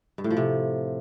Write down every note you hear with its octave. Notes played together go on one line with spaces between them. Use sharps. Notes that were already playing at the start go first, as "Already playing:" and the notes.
G2
A2
F3
C3